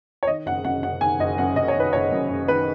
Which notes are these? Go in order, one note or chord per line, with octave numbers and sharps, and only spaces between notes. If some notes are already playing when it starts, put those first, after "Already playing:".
C#5
D#3 D#5
F#1 F#5
F#2 F#5
F#1 F#5
D#3 G#5
F#1 D#5
F#2 F#5
F#1 D#5
C#5
D#3 B4
F#1 C#5
F#2
F#1
D#3 B4